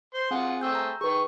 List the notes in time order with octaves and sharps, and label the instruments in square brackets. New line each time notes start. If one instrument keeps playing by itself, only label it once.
[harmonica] C5 C6
[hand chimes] C4 [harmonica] F4 G#4 F#5
[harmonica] A3 C4 G#4 [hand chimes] E6 G6
[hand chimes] A#5
[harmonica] D#3 C#6 [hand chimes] G#4 B4